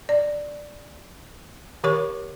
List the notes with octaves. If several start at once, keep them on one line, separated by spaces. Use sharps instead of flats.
D5
D#3 G4 A#4 C#5 C#6